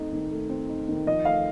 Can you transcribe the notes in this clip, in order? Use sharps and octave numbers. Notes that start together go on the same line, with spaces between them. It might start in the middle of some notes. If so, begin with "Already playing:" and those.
Already playing: A3 C4 D#4
D#3
A3
C4
D#4
D#3
F3 D#5
A3 F5